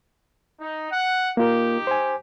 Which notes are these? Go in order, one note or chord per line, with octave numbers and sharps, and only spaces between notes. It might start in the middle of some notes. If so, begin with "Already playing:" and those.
D#4
F#5
A#3 D#4 F4 G4 A#4
C5 G#5